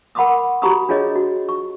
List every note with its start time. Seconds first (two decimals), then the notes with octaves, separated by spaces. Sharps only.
0.15 A#4 F#5 B5 C6 D6 D#6
0.62 F#4 G4 A#5 B5 C#6 D#6
0.89 D4 F4 G#4 C#5 D#5
1.16 F#4
1.49 C#6